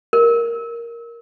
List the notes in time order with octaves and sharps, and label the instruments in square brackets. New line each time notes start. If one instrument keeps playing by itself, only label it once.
[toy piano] A#4